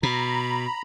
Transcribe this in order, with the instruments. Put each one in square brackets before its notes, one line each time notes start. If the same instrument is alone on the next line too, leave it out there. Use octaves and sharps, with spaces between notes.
[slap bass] B2 [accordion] A#5 B5